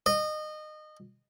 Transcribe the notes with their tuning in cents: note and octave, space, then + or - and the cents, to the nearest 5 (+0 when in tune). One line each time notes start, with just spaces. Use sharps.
D#5 -25